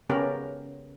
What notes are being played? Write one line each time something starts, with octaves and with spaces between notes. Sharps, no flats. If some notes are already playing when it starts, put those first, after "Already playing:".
C#3 B3 C#4 G4 A#4